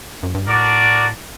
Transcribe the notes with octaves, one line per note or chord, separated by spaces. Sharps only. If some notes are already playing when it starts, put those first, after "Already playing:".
F#2
G2
A2 D4 F#4 A#4 D5